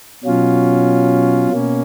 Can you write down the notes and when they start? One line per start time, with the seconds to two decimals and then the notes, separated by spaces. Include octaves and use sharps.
0.24 B2 F#3 C#4 F4
1.51 B2 A#3 C#4